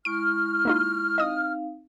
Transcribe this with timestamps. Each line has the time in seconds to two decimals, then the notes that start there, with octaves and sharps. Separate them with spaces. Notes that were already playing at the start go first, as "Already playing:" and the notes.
0.05 G#3 E4 C#6 F6 D7
0.65 A#3 D#4 F4
1.18 C4 D#4 D#5 F5 D#6